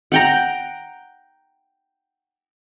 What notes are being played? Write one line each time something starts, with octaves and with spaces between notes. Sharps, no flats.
F#5 G5 A#5